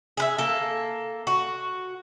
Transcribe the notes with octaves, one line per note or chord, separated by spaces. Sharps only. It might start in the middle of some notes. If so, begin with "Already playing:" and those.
G#4 B4 E5
A#3 A4
F#4